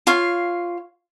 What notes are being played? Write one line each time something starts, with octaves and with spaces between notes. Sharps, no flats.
F4 C#5 F5